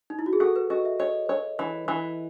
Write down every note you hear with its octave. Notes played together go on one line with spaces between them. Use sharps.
D#4
E4
F#4
G#4
F#4 A4
B4
F#4 D#5
E5
C#5 D#5
C#5
E3
E3